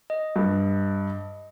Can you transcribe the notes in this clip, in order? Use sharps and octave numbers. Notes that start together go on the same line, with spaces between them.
D#5
G2